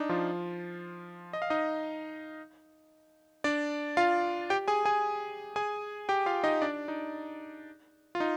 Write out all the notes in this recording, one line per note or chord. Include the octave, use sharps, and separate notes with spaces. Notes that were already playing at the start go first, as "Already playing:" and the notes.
Already playing: D4 D#4
F3 F4
D#5
F5
D#4 D#5
D4 D5
F4 F5
G4 G5
G#4 G#5
G#4 G#5
G#4 G#5
G4 G5
F4 F5
D#4 D#5
D4 D5
D#4
F4
D#4